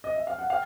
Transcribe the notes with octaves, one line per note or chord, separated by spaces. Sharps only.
D#5
E5
F5
F#5
F5 G5